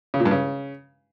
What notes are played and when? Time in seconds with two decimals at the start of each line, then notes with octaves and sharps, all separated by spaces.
0.14 C#3
0.20 A#2
0.25 G2
0.31 C#3